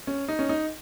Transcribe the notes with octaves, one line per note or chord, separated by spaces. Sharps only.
C#4
D#4
C#4
D#4